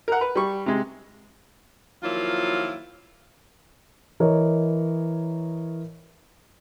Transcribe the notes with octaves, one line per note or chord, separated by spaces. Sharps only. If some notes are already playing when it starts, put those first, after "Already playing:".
A#4 F#5
B4
G3 C#6
C3 G#3
D#3 F3 F#3 A#3 E4 F4
E3 A#4 C#5 D#5